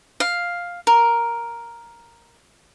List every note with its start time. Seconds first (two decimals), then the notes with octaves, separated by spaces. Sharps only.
0.20 F5
0.87 A#4